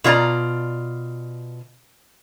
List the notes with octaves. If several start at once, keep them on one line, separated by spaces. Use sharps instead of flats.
B2 F4 C5 D5 A#5